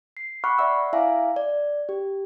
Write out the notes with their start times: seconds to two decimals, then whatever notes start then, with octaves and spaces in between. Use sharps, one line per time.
0.17 C7
0.44 F#5 B5 C#6 D6 F6 F#6
0.58 D5 E5 F#5 E6
0.93 E4 E5 F5 G#5 A#5 D6
1.36 D5
1.89 G4